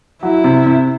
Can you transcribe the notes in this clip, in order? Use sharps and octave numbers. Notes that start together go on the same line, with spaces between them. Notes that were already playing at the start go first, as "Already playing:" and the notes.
F#3 E4
C3
C3